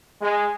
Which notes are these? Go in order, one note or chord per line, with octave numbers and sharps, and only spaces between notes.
G#3